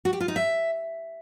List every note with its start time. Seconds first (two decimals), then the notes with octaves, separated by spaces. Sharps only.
0.05 F#4
0.13 G4
0.20 F4
0.28 D#4
0.36 E5